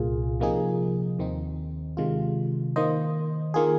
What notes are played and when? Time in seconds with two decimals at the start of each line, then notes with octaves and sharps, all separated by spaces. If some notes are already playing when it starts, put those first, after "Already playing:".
Already playing: C2 A#2 A#3 F4 G#4
0.40 C3 F3 A#3 D#4 G#4
1.19 D#2 D#3 C4 D#4
1.97 C3 D#3 G#3 F4
2.76 D#3 A#3 D#4 C5 D#5
3.54 D#3 A#3 F4 G#4